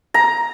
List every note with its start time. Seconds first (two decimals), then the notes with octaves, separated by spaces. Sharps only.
0.14 A#5